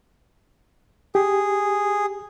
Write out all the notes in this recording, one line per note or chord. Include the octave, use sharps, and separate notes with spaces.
G4 G#4